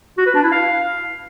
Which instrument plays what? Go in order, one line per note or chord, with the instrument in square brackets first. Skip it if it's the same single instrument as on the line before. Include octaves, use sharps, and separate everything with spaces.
[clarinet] F#4
B4
D4
E4
F5